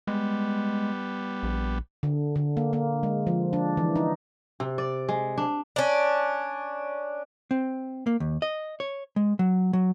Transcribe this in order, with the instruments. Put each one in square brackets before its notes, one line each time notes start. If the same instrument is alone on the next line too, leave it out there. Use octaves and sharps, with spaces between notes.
[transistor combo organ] G3 B3 [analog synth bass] G#3
[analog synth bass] A#1
[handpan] D3
D3
A#3
A#3
G#3
F3
D4
E3
D#4
[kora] C3
D5
G#3
D4
[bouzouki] C#4 D4
[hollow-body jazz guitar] C4
A#3
D#2
D#5
C#5
G#3
F#3
F#3